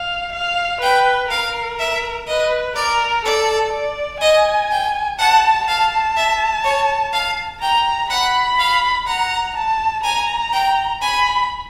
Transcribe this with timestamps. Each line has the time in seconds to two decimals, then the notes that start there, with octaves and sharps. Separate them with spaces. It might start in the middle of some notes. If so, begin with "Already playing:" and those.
Already playing: F5
0.33 F5
0.81 B4 G5
1.30 A#4 F5
1.79 E5
2.27 B4 D#5
2.75 A#4 D5
3.25 A4 D5
3.73 D5
4.21 D#5 G#5
4.71 G5
5.19 F#5 A5
5.67 F5 A5
6.16 E5
6.64 C#5
7.12 F5
7.61 G5 A#5
8.09 F#5 B5
8.59 F5
9.06 F#5 A#5
9.56 A5
10.03 G#5 A#5
10.52 G5
11.01 G#5 B5